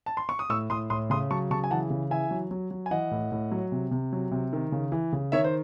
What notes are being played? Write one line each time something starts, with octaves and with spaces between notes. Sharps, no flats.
A5
C6
C#6
D#6
A2 C#6 E6
A2 C6 D#6
A2 C6 D#6
C#3 C6 D#6
F#3 A5 C#6
C#3 A5 C#6
G#5
E3 F#5 A5
C#3
E3 E5 G#5
F#3
F#3
F#3
G#5
E3 D#5 F#5
A2
A2
F#3
C3
C3
F#3
C3
D#3
C#3
E3
C#3
D#3 C#5 E5
C5